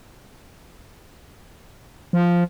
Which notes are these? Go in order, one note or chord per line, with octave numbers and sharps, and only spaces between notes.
F3